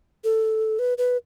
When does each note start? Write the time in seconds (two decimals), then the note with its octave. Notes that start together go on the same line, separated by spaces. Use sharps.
0.24 A4
0.79 B4
0.98 B4